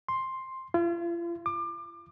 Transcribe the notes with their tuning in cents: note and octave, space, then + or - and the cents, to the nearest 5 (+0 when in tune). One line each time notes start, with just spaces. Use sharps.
C6 +10
F4 -40
D6 +30